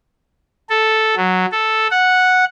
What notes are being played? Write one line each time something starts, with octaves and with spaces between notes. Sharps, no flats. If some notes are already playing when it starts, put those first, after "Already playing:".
A4
F#3
A4
F#5